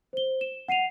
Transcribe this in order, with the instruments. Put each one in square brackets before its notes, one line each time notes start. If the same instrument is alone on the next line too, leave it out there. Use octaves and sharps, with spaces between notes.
[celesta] C5 G7
E7
F#5 C7 D#7 F7